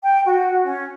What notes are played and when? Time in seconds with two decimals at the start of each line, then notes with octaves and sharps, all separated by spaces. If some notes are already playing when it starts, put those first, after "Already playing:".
0.03 G5
0.25 F#4
0.64 C#4